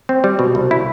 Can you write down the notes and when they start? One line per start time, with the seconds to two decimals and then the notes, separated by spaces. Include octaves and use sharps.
0.09 C4
0.24 G3
0.39 B2
0.55 C2
0.71 E4